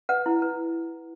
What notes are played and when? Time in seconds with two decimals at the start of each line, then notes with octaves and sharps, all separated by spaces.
0.09 B4 F#5
0.26 E4
0.42 B4